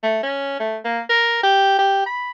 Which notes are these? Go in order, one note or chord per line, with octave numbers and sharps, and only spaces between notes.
A3
C#4
A3
A#3
A#4
G4
G4
B5